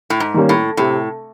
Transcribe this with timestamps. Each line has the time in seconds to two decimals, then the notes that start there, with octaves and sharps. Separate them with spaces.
0.10 A2
0.20 G#2
0.34 D#3 G3 A#3 C#4
0.49 A2
0.77 A2 C3